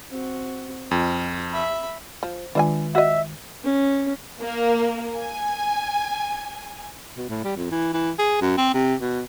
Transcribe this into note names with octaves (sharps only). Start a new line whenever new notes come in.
C4 F#4
F2 F4
E5 B5
F3
D#3 G#3 D4 F4 E5 G#5
F#4 D#5 E5
C#4
A#3
G#5
B2
A2
G3
F2
E3
E3
G#4
F#2
C4
C3
B2